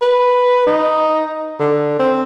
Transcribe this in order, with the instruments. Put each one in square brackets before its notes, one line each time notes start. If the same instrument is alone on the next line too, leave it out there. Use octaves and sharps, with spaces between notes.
[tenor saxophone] B4
D#4
D3
C4